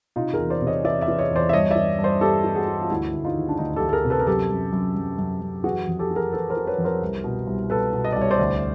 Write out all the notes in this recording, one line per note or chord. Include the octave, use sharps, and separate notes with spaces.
C3 D#4 F4
G#4 A#4
E2
C5 D5
C3
C#5 D#5
E3 D5 E5
D5 E5
E3
C#5 D#5
E2 C5 D5
E5
G2 C#5 D#5
E3 D5 E5
G2
C5 D5
E3 G4 A4
E3
F#4 G#4
E3
F4
D2 E4 F#4
D2
D#4 F4
D#3
D4
D2 D#4
D2 G4 A4
A4
G#4 A#4
C3
A4 B4
A#4
F#2 G4 A4
F#2
F#2
F#2
F#2
F#2
E3 F#4 G#4
F2
G4 A4
E3
G#4 A#4
E3 A4 B4
A#4 C5
E3
B4 C#5
F2
A#4 C5
C2
B2
C2
B2 A4 B4
B2
D#5
C2 D5
C#5
C5 D5
D2